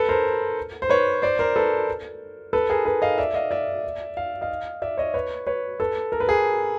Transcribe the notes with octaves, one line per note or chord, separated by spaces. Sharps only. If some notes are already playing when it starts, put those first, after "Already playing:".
Already playing: A4 B4
A#4 C5
C5
B4 C#5
C5 D5
A#4 C5
A4 B4
A4 B4
G#4 A#4
A4 B4
D#5 F5
D5 E5
D#5 F5
D5 E5
F5
D#5 F5
D5 E5
C#5 D#5
B4 C#5
B4 C#5
A4 B4
A#4
B4
G#4 A#4